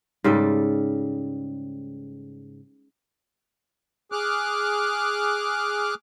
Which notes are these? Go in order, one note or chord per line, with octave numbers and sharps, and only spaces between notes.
G#2 C#3 G3 A4
G#4 D6 F6 F#6